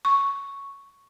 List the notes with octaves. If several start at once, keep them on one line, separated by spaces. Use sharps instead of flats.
C#6